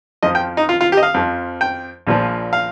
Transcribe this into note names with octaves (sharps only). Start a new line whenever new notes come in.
F2 F3 D#5
G5
D#4
F4
F4
G4
D#5
F5
F2 F3
G5
A#1 A#2 F3
F5